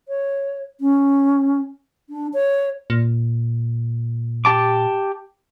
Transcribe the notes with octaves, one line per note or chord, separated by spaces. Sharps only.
C#5
C#4
D4
C#5
A#2
G4 A5 D6